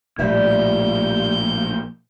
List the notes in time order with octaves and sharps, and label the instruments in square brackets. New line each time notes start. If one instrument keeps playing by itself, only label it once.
[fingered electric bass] A#1 A2 [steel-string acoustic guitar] G3 E5 [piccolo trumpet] G6